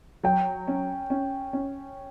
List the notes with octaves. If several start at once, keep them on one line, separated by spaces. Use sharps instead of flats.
F#3 G5
C#4
C#4
C#4